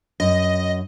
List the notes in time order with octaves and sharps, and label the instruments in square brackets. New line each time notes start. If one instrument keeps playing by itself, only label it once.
[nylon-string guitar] F#2 [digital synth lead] D#5